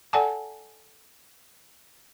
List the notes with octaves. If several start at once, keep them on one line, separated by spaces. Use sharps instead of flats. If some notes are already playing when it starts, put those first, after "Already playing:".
A4 D5 F#5 G#5 A5